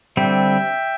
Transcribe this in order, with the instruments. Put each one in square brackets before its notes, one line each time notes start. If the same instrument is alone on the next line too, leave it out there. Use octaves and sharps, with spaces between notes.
[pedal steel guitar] D3 G3 C4 [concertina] E5 G5